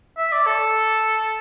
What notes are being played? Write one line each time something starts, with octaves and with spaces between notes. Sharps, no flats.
E5
D5
A4